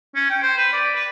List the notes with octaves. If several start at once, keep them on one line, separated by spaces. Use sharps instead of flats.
C#4
G5
C5
B4
D5
B4